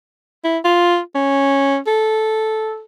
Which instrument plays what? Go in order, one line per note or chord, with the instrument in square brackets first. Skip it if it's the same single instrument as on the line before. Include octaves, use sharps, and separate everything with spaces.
[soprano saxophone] E4
F4
C#4
A4